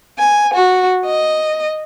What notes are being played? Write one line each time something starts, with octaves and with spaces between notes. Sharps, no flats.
G#5
F#4
D#5